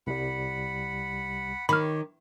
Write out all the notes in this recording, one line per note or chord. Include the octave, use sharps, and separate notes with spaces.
C2 G3 F#5 B5
D#3 G4 C#5 B5 F6